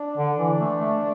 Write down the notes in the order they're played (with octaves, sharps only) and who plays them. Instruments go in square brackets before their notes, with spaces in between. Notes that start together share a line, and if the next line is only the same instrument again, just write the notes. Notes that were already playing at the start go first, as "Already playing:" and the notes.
Already playing: [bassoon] D4
[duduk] D3
E3
A3
A3